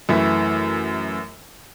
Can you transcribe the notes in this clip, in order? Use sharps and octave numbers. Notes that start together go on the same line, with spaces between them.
F#2 E3 A3 E4